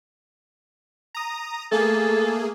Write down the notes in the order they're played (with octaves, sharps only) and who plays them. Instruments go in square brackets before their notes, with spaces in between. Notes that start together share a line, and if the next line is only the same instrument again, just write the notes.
[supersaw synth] A#5 D#6
[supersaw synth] A3 A#3 G#4 [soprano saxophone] A4